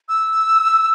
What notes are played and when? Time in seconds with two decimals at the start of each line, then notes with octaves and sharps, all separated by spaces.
0.09 E6